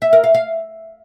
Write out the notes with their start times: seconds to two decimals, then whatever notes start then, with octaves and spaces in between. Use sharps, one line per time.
0.02 E5
0.13 A#4
0.24 F5
0.35 F5